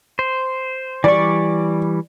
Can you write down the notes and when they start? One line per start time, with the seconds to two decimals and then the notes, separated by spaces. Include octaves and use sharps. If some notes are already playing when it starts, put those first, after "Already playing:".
0.19 C5
1.04 E3 G3 D5 C#6